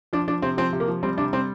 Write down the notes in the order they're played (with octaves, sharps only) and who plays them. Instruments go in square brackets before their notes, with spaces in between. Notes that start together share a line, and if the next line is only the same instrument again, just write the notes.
[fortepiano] F3 D4
F3 D4
C3 C4
F3 C4
C3
A#3
F3
G3 C4
C3 D4
G3 C4